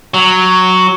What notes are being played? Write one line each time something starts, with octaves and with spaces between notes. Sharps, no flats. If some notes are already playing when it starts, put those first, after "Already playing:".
F#3